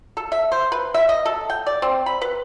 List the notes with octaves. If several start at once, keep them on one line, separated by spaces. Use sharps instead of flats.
A4
E5
C5
B4
E5
D#5
A4
G5
D5
C4
B5
B4